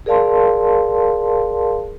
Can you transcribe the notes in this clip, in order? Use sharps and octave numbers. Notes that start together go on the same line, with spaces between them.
G#4 A#4 D5 F5 A5 C6